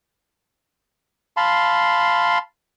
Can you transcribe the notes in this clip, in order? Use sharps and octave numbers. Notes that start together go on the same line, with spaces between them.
F5 A5 B5 C6